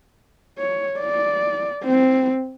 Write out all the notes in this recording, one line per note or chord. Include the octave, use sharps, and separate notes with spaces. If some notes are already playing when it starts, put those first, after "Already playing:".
C#5
D5
C4